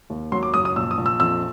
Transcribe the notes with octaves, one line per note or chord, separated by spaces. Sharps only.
D#2
F#3 C6
D6
F#1 D#6
D#6
A#1 E6
D#6
A#1
E6
F2 E6